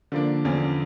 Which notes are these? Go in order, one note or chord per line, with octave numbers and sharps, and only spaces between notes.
D3 F3 A#3 D4
E2 D3 F3 C#4